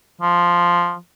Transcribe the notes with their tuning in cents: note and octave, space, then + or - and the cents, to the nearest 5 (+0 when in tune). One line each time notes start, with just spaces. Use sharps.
F3 +0